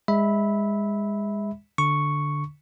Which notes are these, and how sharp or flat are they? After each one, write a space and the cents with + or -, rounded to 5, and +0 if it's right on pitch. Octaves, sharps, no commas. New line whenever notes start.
G#3 -25 E5 -20 B5 +0
D3 +0 C#6 +0